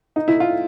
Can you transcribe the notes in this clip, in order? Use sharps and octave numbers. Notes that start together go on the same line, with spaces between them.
D#4
E4
F4